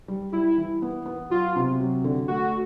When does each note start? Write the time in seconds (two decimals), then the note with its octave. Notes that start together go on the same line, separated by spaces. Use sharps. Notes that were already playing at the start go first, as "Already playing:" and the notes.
0.08 G3
0.32 G3 E4
0.57 E3
0.82 B3
1.06 B3
1.30 F#3 F4
1.56 C3
1.80 F#3
2.04 D3
2.28 A3 F#4